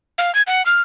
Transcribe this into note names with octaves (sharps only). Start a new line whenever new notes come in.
F5
G#6
F#5
F6